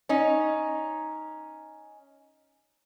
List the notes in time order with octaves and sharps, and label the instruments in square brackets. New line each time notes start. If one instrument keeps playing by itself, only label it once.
[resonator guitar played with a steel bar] C#4 D#4